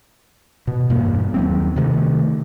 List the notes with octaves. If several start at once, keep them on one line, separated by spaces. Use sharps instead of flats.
B2
E2 G2 A#3
D#2 F#3 C4
C3 D#3 A3